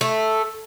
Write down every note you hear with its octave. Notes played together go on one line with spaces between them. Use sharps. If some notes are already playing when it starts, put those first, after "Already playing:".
A3